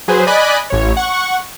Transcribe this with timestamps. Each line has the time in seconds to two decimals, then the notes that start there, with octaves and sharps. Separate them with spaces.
0.08 F#3 G#4 B4 C5
0.27 D5 D#5 G#5 B5 F#6
0.70 A1 C#5
0.97 F#5 C#6